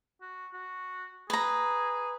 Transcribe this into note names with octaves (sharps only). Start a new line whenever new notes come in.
F#4
F#4
G#4 B4 A#5